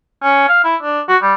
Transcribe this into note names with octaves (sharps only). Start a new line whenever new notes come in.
C#4
F5
E4
D4
F#4
G3